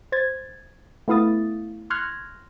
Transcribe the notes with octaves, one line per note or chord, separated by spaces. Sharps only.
C5 G#6 A6
A3 B3 E4 F5 D#6 A6
C6 C#6 F6 F#6 G#6 A#6